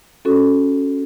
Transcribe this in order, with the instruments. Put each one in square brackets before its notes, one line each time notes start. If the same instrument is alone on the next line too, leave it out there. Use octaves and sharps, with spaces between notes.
[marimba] C#4 F#4 A4